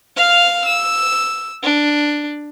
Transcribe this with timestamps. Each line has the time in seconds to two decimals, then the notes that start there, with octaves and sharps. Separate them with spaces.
0.17 F5 F6
0.66 E6
1.63 D4